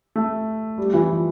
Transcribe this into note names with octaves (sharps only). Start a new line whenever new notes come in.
A3
G3
E3
F3